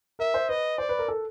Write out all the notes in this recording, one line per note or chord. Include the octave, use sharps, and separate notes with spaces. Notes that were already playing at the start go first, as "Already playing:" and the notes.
A#4 E5
C5
B4 D#5
C5 D5
B4
A#4
A4